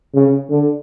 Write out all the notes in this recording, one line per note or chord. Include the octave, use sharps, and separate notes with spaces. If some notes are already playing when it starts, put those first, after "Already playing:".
C#3
D3